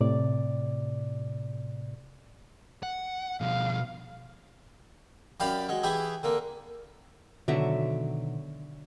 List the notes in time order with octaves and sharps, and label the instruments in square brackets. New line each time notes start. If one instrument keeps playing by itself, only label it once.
[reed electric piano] A2 C3 D5
[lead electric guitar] F#5
[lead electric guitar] B2 F3 [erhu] F5
[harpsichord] F#2 G4 D5 F5 B5
F#3 G#3
E3 E4 G4 G#4
D3 A#3
[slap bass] B2 D#3 [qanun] D3 F#3 E5